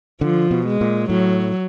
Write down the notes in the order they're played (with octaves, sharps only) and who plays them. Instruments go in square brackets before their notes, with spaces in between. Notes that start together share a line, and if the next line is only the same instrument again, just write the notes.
[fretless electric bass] D3 [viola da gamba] F3
[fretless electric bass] B2
[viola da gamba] G#3
[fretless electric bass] A#2
[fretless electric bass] A2 [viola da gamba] F#3